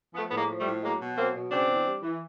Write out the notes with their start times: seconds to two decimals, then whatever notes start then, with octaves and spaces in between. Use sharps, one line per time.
0.14 F3 A3 B3
0.29 A2 B3
0.37 G#3 A#3
0.49 F3
0.59 G3 A3
0.66 A2
0.82 F#3 G#3 A#3
1.00 B2
1.16 F#3 A#3 C4
1.34 B2
1.50 C#3 C4 D4
1.69 E2
1.86 G3
2.02 E3